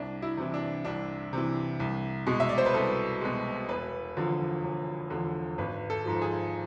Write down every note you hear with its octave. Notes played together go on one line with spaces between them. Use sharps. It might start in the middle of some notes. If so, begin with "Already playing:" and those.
Already playing: C2 D4
E4
C3 E3
D4
C2 D4
C3 E3
C2
B2 G#3
E5
D5
C5
B4
C2 A4
B2 G#3
E1 B4
E2 D3 F3
E1
E2 D3 F3
G#1 B4
A4
G#2 F3
G#4